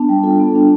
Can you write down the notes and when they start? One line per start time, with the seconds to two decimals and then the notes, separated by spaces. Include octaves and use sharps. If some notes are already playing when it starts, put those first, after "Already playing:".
Already playing: B3 D4 A5
0.09 G3 G5
0.23 F4 A4
0.40 B3
0.55 D4